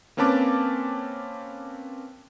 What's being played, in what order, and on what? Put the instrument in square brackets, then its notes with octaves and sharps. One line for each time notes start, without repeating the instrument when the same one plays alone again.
[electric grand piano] A#3 C4 C#4 B4 A5 D6